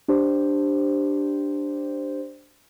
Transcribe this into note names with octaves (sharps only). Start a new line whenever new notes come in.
D4 G4 C5